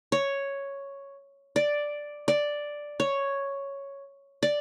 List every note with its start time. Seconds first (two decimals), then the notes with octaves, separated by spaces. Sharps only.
0.12 C#5
1.56 D5
2.28 D5
3.00 C#5
4.43 D5